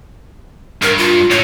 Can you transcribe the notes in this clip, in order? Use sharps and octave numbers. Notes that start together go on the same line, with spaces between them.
G2 A#4
F4
A2 C#5